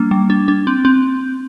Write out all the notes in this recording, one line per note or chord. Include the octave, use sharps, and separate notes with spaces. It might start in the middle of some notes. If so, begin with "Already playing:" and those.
Already playing: G3 A#3 D4
G3
D4
D4
C4
C4